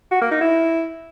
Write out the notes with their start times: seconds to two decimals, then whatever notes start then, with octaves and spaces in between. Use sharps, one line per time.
0.12 F#4
0.22 A#3
0.31 D#4
0.41 E4